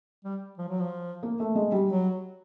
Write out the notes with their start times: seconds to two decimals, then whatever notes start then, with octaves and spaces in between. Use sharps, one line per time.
0.25 G3
0.58 F3
0.69 F#3
0.80 F3
1.23 A#3
1.40 A3
1.55 G#3
1.72 G3
1.89 F#3